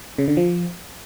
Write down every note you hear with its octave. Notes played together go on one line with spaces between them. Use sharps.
C#3
D3
F3